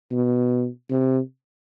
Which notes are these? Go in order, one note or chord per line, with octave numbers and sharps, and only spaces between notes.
B2
C3